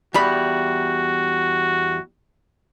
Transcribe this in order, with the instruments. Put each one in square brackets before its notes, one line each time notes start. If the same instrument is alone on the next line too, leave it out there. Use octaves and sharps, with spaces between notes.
[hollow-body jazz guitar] E2 G3 B5 [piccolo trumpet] F#4